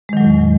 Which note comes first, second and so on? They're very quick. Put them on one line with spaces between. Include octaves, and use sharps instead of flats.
G#3 D#3 F#3 A2 E2